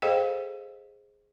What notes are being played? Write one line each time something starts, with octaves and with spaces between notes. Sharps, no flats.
G#4 A4 C5 D#5 F5 G5